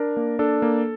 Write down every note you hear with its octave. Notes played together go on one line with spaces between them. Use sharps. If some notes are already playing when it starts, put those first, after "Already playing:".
Already playing: D4 A#4
A#3
D4 A4
A#3